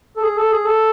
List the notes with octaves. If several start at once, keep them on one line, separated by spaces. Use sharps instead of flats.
A4
G#4
A4
G#4
A4